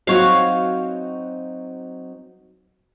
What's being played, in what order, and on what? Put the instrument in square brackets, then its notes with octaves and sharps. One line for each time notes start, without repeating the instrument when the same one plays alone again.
[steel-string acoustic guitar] F#3 C4 D#4 [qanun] F#4 C#5 F5